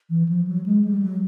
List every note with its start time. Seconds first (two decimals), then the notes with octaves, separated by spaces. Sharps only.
0.10 E3
0.29 F3
0.47 F#3
0.66 G#3
0.85 G3
1.02 F#3